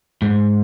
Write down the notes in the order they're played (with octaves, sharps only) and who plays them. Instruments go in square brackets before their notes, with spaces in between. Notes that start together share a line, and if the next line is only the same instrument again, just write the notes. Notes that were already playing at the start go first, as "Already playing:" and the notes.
[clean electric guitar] G#2